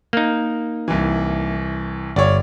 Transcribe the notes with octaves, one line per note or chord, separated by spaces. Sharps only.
A#3 D#4
C2 E3
G1 C#5 D5